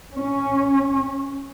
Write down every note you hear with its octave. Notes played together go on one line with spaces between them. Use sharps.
C#4